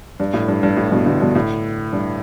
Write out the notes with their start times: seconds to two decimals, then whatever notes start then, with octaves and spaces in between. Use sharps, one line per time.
0.20 G2
0.34 A2
0.48 G2
0.63 G2
0.77 A2
0.91 G2 B2
1.06 A2 D3
1.21 G2 B2
1.35 A2
1.93 G2